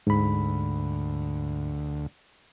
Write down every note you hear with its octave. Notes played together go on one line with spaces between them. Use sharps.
D2 G#2 B5